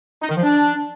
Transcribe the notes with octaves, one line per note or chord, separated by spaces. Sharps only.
D#4
D#3
F3
D4